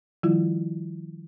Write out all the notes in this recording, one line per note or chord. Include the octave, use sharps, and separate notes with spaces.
D#3 F3 G3 E4 F4